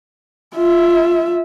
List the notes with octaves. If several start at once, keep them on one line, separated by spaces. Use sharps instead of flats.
F4 E5